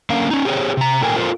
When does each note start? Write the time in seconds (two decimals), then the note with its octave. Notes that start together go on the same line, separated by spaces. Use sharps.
0.10 D3 A#3 C#4 A#4 F5
0.30 C#4 D#4
0.45 G4 G#4 C5 C#5
0.77 C3 A#5
1.01 A#2 D#3 A4 A#4 G5 G#5
1.16 F4 A4 A#4 C5